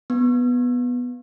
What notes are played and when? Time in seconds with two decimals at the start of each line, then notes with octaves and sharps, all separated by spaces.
0.10 B3